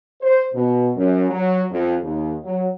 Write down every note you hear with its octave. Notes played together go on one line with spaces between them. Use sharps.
C5
B2
F#2
F#3
F2
D#2
F#3